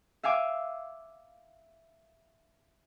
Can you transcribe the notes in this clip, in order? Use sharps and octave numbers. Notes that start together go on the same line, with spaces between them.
E5 F5 G#5 D6